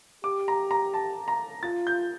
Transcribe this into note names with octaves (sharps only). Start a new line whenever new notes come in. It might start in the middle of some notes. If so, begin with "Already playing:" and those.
G4 D6
A#5
A#5
A5
A#5
F4 A6
G6